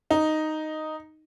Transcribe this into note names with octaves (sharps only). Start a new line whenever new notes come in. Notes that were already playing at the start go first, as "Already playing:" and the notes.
D#4